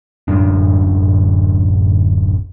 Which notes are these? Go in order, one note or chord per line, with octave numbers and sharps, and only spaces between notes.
D1 F#2 D4